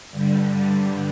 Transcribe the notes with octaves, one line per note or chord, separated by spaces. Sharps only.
G2 D3 G3